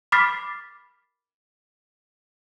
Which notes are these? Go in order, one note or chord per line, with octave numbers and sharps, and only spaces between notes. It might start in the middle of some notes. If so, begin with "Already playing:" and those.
B5 D6 F6 A6 B6 C7